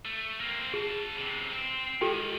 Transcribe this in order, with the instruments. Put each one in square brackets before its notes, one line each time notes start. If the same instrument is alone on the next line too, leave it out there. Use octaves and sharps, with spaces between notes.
[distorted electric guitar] A3
A#3 C4
[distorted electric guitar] C#3 A5 [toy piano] G#4
[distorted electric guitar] C3 E3
C4
[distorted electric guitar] G#2 D#3 [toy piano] G4 A4 G5